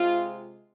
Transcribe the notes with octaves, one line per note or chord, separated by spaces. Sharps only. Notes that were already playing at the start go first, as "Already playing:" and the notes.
Already playing: C3 G#3 C4 F4